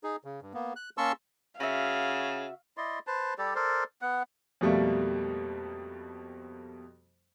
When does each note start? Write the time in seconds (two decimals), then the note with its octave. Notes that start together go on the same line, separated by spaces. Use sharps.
0.03 D#4 G#4
0.24 C#3
0.42 G2
0.54 A#3 B3
0.76 F#6
0.98 A#3 C#4 A5 C6 C#6 E6
1.60 C#3 F#4 E5 F5
2.77 E4 D5 D#5 C6
3.07 B4 C5 A5
3.38 G3 G4 A4 D5
3.55 A4 A#4 C5 D5
4.02 B3 F#5
4.61 F2 B2 G3 A3 A#3